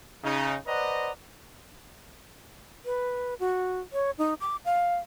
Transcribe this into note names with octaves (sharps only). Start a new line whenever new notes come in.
C#3 D#4
B4 C5 D5 D#5 F#5 A#5
B4
F#4
C#5
D#4
D6
F5